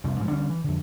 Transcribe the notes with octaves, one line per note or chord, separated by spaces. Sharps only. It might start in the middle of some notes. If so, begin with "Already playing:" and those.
F1 C2 F2
G#2 B2 F3
D2 D3 G3 C#4
E3
F2 D3